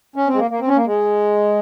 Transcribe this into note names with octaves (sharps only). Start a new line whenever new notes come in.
C#4
C4
G#3
A#3
A#3
C4
C#4
A#3
G#3